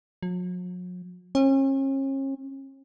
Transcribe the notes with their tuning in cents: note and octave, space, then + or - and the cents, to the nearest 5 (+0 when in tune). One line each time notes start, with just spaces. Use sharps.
F#3 -45
C#4 -40